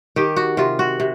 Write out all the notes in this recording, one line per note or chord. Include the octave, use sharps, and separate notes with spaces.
D#3 G4
F#4
C3 F4
F#4
C3